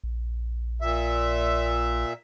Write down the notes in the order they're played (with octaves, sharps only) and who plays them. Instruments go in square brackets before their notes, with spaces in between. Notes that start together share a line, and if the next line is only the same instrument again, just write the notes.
[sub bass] A#1
[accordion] A#2 E5